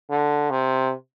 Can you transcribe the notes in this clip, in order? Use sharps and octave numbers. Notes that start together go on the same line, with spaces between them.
D3
C3